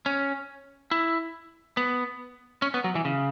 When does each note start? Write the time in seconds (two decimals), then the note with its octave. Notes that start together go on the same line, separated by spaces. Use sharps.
0.06 C#4
0.91 E4
1.77 B3
2.62 C#4
2.74 B3
2.84 F#3
2.95 E3
3.05 C#3